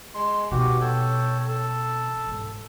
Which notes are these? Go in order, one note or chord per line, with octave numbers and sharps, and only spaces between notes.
G#3 C6
B2 D#3 F#4 G4
A4 C#5 G5
A4
G#2